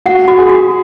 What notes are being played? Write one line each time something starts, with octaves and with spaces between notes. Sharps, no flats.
F#4 F#5
F#4
G#4
F#4